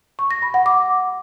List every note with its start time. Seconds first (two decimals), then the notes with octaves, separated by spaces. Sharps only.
0.19 C#6
0.31 A#6
0.42 B5
0.54 F#5
0.66 D6